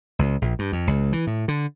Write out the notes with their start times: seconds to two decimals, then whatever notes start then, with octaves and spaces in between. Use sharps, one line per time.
0.19 C#2
0.42 A#1
0.59 G2
0.72 F2
0.87 C#2
1.13 E3
1.27 A2
1.48 D3